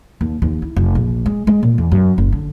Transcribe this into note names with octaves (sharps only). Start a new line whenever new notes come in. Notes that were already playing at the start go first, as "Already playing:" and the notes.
D#2
D#2
E4
F1
A#1
G#3
G#3
A#2
E2
F#2
F#1
D3